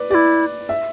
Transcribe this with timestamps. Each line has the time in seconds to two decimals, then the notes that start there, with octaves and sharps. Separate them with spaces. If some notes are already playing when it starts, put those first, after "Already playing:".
Already playing: B4 D5
0.10 E4 G4 D5
0.69 E5